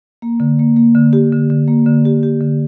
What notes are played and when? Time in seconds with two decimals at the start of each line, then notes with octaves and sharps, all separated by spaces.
0.22 A#3
0.40 D3
0.59 A#3
0.76 A#3
0.95 D3
1.13 G4
1.32 D3
1.50 D3
1.68 A#3
1.86 D3
2.05 G4
2.23 G4
2.41 D3